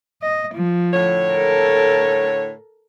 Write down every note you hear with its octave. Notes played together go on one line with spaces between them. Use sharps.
D#5
F3
A2 D3 C#5
A4 A#4